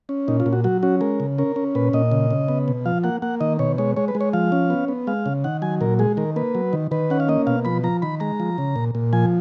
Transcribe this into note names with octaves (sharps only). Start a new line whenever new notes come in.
C#4
A#2 D#4
F4
A#2
F#4
F#3 F#4
C#4 F#4
G#3 A#4
C#3
C#4 A#4
C#4
A#2 B4
A#2 D#5
C#3
C#3
B3
B2
F3 F5
A#3 F#5
A#3 F#5
D#3 D#5
B2 C#5
G#3 C#5
G#3 C#5
B4
G#3
C#5
F3 F5
C#4
B3
B3
G#3 F5
C#3
D#3 F#5
F#3 G#5
A#2 A#4
G#3 G#4
D#3 A#4
A#3 B4
F#3
D#3
D#3 B4
C#4 F#5
F5
A#3 D#5
B2 F5
F3 B5
F3 A#5
D#3 B5
G#3 A#5
F3
C#3
A#2
A#2
F3 G#5